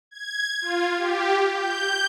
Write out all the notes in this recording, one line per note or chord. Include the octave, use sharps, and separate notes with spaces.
G#6
F4
G4
G6